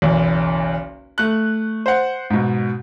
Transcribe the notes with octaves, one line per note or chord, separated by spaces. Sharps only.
F#1 B1 E2
A3 F#6
C5 F#5
G#2 B2